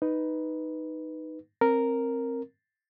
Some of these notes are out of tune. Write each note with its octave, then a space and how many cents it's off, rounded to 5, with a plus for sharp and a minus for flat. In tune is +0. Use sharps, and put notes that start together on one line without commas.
D#4 +0 B4 +0
C4 +20 A#4 -5